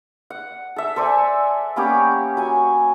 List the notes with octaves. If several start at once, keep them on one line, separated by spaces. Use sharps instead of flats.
F#5
A4 E5
A4 C5 D5 G#5
A#3 B3 C#4 G4
F#3 G#5